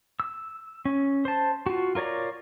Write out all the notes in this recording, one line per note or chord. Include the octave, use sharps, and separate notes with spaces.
E6
C#4
C5 A5
F4 F#4
F4 A#4 C#5 D5 A#5